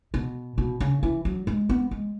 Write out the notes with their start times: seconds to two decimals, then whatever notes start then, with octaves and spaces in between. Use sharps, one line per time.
0.14 B2
0.58 B2
0.80 C#3
1.03 E3
1.25 F#3
1.47 G#3
1.69 B3
1.91 G#3